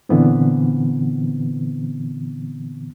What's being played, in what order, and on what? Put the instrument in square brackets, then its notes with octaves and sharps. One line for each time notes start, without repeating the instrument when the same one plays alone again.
[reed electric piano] A#2 D3 E3 B3 C4